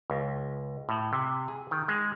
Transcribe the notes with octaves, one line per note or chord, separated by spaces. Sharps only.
C#2
A2
C3
G#4
D#3
G#3